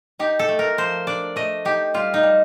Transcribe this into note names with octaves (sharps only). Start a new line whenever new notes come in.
D#4 G4
A4
A3
A#4
F3 C5
D4 D5
A3 D#5
D#4 G4
G3 F4
D#4
G3